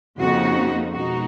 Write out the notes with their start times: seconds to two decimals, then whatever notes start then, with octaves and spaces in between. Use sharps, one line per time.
0.19 F2 C#3 F3 A#3 D#4 F#4
0.92 B2 G#3 D#4 F#4